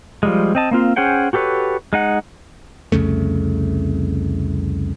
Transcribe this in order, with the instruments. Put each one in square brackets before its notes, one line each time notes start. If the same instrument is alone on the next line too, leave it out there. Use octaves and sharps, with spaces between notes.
[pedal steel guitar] F3 G3 G#3
C4 D#5 A5
A#3 C4 F4
C#4 G#4 C5 F#5 G5
F#4 G4 A4 B4 C#5
G#3 D#4 F#5
[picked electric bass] C2 F2 C#3 A3